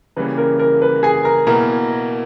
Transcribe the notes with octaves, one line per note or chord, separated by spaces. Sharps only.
C#3 E3 G3 A#3 C#4 B4
A#4
A#4
B4
G#4 G#5
A#4 A#5
B2 A#3 E4 A#4 A#5